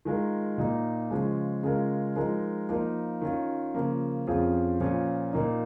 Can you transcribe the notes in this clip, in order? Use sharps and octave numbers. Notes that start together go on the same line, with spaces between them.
D#3 G#3 F4 A#4
A#2 A#3 D#4
C#3 F3 G#3
C#3 G#3 F4 A#4
F3 G#3 D#4 A#4
F3 A#3 D#4 A#4
D#3 C#4 F4
C#3 F3 A#3
F2 F3 C#4 F4 G#4
A#2 F3 C#4
A#2 A#3 D#4